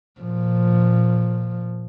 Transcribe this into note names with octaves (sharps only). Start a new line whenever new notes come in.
A#2 F3